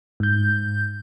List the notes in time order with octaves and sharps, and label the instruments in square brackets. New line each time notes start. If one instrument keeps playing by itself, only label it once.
[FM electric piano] G#2 G6